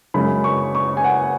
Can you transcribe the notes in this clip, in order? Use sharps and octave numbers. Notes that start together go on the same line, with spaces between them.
F#2 C#3 G#3 B5
C#6
C#6
G#5
F#5